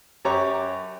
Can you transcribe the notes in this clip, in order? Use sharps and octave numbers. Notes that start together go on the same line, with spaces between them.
F#2 G4 C#5 A#5 C#6 D6